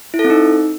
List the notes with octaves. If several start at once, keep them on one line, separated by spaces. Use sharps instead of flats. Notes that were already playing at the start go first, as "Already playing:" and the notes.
E4
A4
C4
D#4